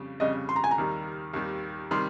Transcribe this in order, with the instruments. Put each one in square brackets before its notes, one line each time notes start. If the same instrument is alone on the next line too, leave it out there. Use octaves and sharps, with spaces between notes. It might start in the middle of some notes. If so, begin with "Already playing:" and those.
Already playing: [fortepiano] F2 C#3 G3
[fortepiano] F2 C#3 G3 [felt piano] D#5
[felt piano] C6
A#5
G#5
A#5
[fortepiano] D#2 D#3 G3
D#2 D#3 G3
[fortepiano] C3 D#3 G3 [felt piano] C6